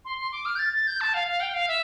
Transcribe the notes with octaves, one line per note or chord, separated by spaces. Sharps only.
C6
C6
D6
F6
G6
A6
A6
G6
A5
F5
F5
G5
F5
E5